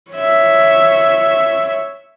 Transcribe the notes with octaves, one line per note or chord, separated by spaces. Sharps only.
C#5 E5